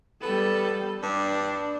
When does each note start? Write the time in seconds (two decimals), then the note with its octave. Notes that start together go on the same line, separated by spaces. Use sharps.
0.22 G3 B3 A4
1.03 G2 D4